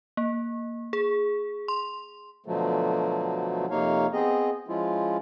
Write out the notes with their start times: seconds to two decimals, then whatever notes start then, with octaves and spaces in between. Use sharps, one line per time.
0.17 A#3
0.93 G#4
1.68 C6
2.46 B2 D3 F3 F#3 A3
3.70 F2 C3 A#3 D#4 C#5 F5
4.13 B3 C4 G#4 D#5
4.68 F3 G#3 C#4 E4 F4